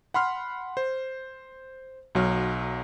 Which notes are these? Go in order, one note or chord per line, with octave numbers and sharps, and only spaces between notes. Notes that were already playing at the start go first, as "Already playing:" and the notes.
F#5 B5 C6 F6
C5
B1 F#3 F6